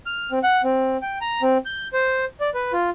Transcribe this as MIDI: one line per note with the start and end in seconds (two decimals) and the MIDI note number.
0.06 0.31 89
0.31 0.39 60
0.43 0.62 78
0.64 0.97 60
1.02 1.18 79
1.21 1.42 82
1.42 1.58 60
1.66 1.88 91
1.93 2.25 72
2.40 2.50 74
2.54 2.72 71
2.73 2.90 65